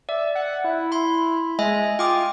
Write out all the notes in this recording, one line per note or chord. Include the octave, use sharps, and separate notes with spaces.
D5 E5
F#5
E4
B5 C6
G#3 D#5 E5 G#5
F4 G5 D6 D#6